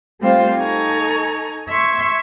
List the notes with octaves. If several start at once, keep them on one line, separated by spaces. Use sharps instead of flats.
G3 A3 C4 F4 C5 F5
D#4 A4 G#5 A#5 C#6
E5 C6 C#6 G#6